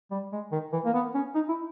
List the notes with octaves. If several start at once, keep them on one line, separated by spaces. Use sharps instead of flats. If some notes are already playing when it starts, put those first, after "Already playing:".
G3
G#3
D#3
E3
A#3
B3
C#4
D#4
E4